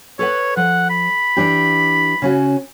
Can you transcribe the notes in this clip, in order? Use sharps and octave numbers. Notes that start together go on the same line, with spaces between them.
A4 B4 C#5 F#5
F3 F#5
B5
E3 D4 G4
C#3 C#4 F#4